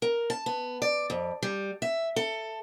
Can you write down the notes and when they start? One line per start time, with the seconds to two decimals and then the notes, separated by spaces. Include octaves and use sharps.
0.02 A#4
0.30 A5
0.46 B3
0.82 D5
1.10 F2
1.43 G3
1.82 E5
2.16 A4